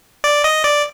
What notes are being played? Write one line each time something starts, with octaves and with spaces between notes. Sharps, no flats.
D5
D#5
D5